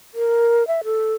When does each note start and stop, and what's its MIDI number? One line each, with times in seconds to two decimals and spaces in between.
0.14 0.66 70
0.67 0.81 76
0.84 1.14 69